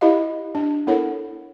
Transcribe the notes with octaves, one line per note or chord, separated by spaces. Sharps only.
E4 G4 D#5 F5
D4
B3 E4 A4 A#4 C#5 F#5